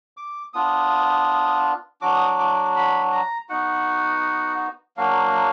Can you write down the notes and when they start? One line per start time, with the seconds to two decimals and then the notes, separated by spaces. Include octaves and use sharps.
0.17 D6
0.53 B3 D4 F4 D#6
2.01 F#3 D4 F#4 D6
2.14 D#6
2.26 D6
2.39 D6
2.76 B5
3.12 A#5
3.49 B3 D#4 F#4 F#5
4.97 F#3 A#3 D4 F#4 F5